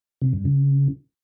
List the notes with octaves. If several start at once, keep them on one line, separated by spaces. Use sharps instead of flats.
C3
G2
C#3